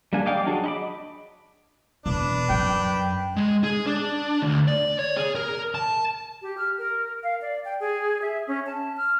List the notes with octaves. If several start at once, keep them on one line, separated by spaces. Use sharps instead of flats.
G3 A#3 D4 G#5
D5 D#5 F5 G5 D6
F#3 D4 F#4 G#4
D#5 B5 D6
E1 D4 B4
F#2 G5
G#3
G#4
D4
D2
D5
C#5
G#4
A#4
A5
G4
F6
A#4
F5
D5
G5
G#4
E5
C#4
A5
F6